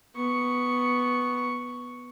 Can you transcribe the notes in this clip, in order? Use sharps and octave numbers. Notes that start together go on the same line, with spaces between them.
B3 C#6